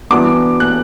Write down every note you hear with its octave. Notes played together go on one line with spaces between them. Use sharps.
E3 B3 D4 F#4 D6
F#6